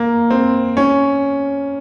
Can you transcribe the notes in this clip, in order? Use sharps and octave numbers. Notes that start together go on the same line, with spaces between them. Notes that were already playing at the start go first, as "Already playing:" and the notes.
Already playing: A#3
C4
C#4